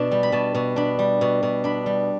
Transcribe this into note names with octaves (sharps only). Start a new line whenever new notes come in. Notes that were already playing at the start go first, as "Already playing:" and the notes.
Already playing: B2 D4 A5
G3
B5
B2 A5
B2
D4 B5
G3
B2
B2
D4 B5
G3